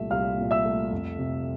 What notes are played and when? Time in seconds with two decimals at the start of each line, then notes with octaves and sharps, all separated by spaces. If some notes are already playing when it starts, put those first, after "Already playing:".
Already playing: C2 A#2 A3 E5
0.11 C2 F5 F6
0.38 A#2
0.51 E5 E6
0.65 A3
0.92 F2
1.19 C3